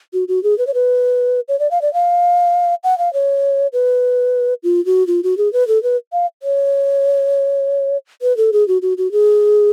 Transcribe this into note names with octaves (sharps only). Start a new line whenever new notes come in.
F#4
F#4
G#4
B4
C#5
B4
C#5
D5
F5
D5
F5
F#5
F5
C#5
B4
F4
F#4
F4
F#4
G#4
B4
A4
B4
F5
C#5
B4
A4
G#4
F#4
F#4
F#4
G#4